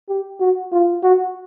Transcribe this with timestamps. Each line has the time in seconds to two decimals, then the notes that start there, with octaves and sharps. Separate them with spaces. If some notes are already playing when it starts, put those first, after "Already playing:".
0.09 G4
0.40 F#4
0.72 F4
1.03 F#4